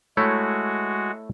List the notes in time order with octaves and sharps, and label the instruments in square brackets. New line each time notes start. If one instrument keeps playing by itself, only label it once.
[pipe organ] G#3 F#4 [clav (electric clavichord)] A3 E4 C#5